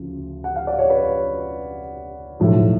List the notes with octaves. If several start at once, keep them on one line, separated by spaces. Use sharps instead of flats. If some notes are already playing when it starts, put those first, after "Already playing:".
Already playing: D2 C#3 F3
F#5
F5
D5
C#5
B4
B1 A2 F3